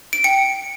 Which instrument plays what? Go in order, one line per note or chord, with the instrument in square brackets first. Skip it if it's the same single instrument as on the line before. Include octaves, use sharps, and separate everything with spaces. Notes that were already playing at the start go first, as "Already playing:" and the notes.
[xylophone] D7
G5 C#7